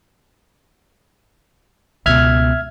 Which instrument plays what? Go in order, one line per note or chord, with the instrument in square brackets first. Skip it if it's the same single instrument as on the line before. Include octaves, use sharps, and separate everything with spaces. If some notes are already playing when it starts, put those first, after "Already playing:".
[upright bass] C#2 B2 [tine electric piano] E5 F6 G#6